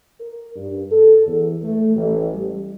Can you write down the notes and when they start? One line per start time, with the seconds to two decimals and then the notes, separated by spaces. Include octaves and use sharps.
0.20 A#4
0.56 G2
0.90 A4
1.26 E2
1.62 A3
1.96 A1
2.35 G3